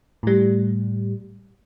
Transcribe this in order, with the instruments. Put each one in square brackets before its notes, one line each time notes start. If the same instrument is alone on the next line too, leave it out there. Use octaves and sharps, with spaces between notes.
[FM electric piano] A2 G3